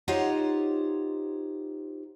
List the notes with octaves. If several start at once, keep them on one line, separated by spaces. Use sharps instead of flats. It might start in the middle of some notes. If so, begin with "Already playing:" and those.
D#4 F4 G4 C5 C#5 F#5